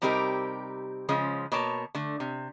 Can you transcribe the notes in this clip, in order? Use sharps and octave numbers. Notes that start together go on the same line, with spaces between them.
C3 G3 C4 D#4 G4 A#4
C#3 F3 G#3 C#4
B2 A#3 C#5 A5
D3 A3
C3